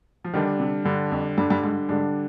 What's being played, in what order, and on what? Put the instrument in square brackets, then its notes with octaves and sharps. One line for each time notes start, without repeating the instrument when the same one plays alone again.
[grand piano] F3
[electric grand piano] D3 G3 D4 [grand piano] D#3
[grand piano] C3
[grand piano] G2 [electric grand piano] D3 G3 D4
[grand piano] F2
[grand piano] G2 [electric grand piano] D3 G3 D4
[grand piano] G2
G#2
[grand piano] G#2 [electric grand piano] D3 G3 D4